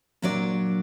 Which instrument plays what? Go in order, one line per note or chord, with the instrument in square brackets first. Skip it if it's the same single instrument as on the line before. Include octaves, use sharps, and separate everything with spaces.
[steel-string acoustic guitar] A#2 F#3 D4 D5